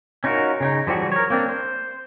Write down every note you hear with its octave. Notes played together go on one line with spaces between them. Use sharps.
C#4 D#4 F4 F#4 A#4
C#3 C#4 D#4
E3 F3 G3 F#4 G#4
A#4 C#5
A#3 C4 D4
C5